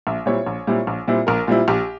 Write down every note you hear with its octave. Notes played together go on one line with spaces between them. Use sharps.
A#1 E5
A#2 G3 C4 E4 C#5
A#1
A#2 G3 C4 E4
A#1
A#2 G3 C4 E4
A#1 A#4
A#2 G3 C4 E4 F4
A#1 G4